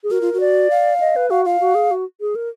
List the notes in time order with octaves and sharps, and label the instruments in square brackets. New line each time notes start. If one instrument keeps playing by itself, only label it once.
[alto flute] G#4
[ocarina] F#4 [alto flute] A#4
[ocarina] F4
F#4
[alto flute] D5
[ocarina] F5
[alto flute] D#5
B4
[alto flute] F#4 [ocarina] F5
[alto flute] F4 [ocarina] F5
[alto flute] F#4
G#4
F#4
G#4
A#4